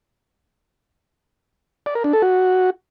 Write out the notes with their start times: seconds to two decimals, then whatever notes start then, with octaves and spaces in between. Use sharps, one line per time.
1.86 D5
1.95 A#4
2.04 D4
2.13 A4
2.22 F#4